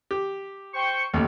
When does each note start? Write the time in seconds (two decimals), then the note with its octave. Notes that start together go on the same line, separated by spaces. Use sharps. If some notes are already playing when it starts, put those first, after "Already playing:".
0.11 G4
0.74 C5 G5 C#6
1.14 A1 D#2